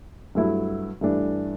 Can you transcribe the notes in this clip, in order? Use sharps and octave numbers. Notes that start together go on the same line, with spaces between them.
G2 F#3 A3 E4
G2 E3 A3 D4